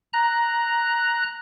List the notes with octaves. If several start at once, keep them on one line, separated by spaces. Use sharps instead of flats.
A#5 F#6